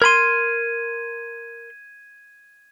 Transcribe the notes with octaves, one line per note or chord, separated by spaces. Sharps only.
A#4 B5 C6 G#6 D#7